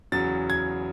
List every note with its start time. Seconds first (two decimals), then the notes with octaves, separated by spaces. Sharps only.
0.12 E2 C#3 F#3 A6
0.50 G#6